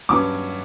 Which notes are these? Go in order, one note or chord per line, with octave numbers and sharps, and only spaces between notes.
G2 F#3 C#4 D6